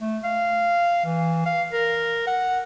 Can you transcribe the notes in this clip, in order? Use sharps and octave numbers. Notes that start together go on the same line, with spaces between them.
A3
F5
E3
F5
A#4
F#5